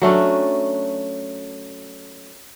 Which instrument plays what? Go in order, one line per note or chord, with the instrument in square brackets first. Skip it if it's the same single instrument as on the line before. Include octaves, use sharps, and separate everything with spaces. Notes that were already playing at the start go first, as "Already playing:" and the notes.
[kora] F#3 A3 C#4 D4